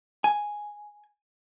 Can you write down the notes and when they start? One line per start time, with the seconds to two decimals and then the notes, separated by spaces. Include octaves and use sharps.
0.24 G#5